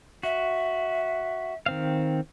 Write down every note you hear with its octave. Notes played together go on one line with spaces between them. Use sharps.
F#4 E5
D#3 C4 F5